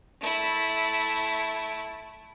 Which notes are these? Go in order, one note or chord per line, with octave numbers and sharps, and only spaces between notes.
A3 E4